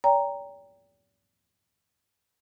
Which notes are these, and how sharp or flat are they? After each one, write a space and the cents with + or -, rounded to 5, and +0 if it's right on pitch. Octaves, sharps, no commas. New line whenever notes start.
D5 -45 G5 +15 A#5 +0